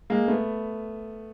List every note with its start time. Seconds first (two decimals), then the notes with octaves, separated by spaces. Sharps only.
0.10 G#3 A#3
0.28 A3 B3